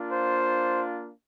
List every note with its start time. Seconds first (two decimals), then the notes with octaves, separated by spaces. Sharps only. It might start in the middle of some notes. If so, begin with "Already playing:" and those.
Already playing: A#3 D4 F4
0.11 C5